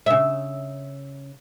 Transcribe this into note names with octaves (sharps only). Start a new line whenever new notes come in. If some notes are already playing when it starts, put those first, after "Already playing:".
C#3 E5